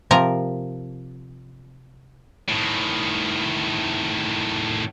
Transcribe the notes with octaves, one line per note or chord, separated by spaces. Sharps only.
C3 F3 A#4 A#5
A2 D#3